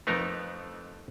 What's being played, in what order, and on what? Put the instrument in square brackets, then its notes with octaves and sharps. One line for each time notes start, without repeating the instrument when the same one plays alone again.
[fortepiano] F2 B4 [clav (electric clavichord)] A3 D#4 A#4